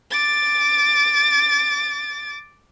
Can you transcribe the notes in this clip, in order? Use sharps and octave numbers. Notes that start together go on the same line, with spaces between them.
D6 A6